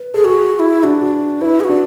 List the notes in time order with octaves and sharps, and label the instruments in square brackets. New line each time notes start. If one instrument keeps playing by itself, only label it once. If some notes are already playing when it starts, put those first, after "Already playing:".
Already playing: [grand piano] B4
[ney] G#4 [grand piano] A4
[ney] F#4 [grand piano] G#4
[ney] F#4
E4
[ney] D4 [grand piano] F#4
[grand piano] F#4
[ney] E4 [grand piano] B4
[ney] G#4
F#4
[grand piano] D4